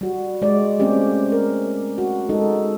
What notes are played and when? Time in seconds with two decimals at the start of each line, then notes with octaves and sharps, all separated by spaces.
0.01 G3 F#4
0.42 G#3 D5
0.80 A3 A#3 C4 C#4 G4
1.32 A#4
1.98 F#4
2.29 G#3 D#4 A4